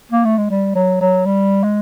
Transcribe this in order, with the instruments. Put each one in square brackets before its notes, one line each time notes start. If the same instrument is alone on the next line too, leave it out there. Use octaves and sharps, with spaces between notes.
[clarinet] A#3
A3
G#3
G3
F#3
F#3
G3
G#3